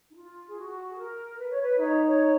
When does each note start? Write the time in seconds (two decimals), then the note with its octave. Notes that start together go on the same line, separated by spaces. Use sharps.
0.10 D#4
0.15 F4
0.47 G#4
0.56 F#4
0.90 G#4
0.97 A#4
1.38 B4
1.50 C#5
1.61 B4
1.79 D#4 C#5
2.06 C#5